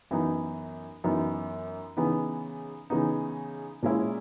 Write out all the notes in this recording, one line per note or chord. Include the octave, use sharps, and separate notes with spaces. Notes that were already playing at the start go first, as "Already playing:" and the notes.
F#2 E3 B3 D#4
F#2 E3 B3 D#4
C#3 E3 B3 D#4
C#3 E3 B3 D#4
A#2 G#3 C#4 E4